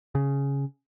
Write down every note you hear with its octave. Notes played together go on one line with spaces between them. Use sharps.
C#3